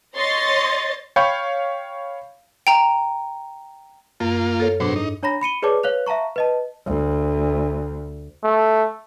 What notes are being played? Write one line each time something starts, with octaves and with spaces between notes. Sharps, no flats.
C#5 D#5 C6 A6
C#5 F5 G5 B5 C#6 G6
G5 A#5
F#2 A#3 F4
A4 C#5
G#2 B2 F#3 D4 C5
D#4
D4 C#5 A#5 B5 A#6
B5 C#7 D#7 G7
G#4 B4 C#5 D5 A5 D6
B4 C#5 F5 F#6 F7
E5 F5 A5 A#5 C#6
B4 D#5 A5
D2
A3